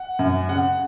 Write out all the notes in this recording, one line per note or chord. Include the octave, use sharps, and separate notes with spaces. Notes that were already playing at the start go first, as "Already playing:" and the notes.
Already playing: F#5
F#2
C#3 F#5